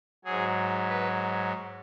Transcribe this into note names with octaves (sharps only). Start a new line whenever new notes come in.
G#2 F#3 G#4
B4